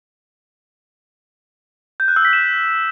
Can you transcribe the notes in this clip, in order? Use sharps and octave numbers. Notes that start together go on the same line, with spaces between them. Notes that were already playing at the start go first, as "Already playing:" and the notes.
G6
F#6
E6
B6
E7